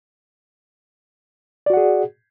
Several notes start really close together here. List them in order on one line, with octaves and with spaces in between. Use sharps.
D5 F#4 F#5 G#4